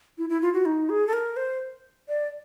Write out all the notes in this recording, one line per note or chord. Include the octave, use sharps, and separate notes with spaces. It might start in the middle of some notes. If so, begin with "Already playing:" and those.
E4
E4
F4
F#4
D#4
G#4
A4
A#4
C5
D5